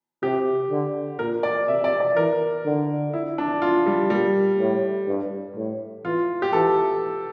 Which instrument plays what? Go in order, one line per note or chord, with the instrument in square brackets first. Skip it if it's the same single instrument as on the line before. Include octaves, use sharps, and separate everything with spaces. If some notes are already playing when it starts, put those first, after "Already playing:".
[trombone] C3 [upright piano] G4
[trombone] D3
[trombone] A#2 [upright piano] A#4
[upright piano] D5
[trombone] C3 [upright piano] E5
[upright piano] D5
D5
[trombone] E3 [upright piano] A#4
[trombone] D3
[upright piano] E4
D4
F4
G3
[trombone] A#2 [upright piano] G3
[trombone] A2
G2
A2
[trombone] E3 [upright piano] F4
[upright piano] G4
[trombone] E3 [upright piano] A4